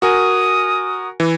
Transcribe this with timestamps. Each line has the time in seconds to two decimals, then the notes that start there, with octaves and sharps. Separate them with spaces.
0.02 F#4 A#4 G#5 D#6
1.20 E3